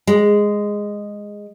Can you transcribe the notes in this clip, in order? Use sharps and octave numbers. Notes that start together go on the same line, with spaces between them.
G#3